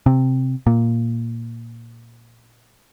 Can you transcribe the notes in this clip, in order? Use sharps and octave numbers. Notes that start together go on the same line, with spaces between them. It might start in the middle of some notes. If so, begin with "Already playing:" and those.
C3
A#2